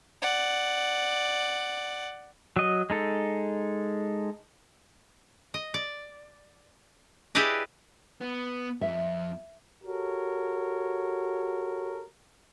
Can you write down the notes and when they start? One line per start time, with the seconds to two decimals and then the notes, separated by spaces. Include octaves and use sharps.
0.22 D5 F#5
2.56 F#3 D#5
2.90 G#3 D#4 A4
5.54 D#5
5.74 D5
7.35 E4 G4 G#4 B4 D5 D#5
8.21 B3
8.81 F2 E5
9.84 F#4 G4 A4 A#4 C#5